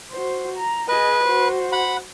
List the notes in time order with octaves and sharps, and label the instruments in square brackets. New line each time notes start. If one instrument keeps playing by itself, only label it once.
[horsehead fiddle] F#4 C5
A#5
[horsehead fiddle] G#4 D#5 [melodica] B4
[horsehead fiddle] F#4 C5
[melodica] F#5 B5